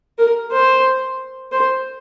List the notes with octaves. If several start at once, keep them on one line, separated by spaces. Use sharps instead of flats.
A#4
C5
C5